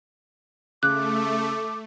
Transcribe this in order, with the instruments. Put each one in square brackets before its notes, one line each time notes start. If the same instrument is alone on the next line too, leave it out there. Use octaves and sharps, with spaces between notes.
[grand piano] C#3 [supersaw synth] A3 [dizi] D6 [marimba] F#6